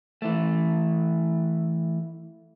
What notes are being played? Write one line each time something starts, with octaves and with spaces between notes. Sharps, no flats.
E3 A3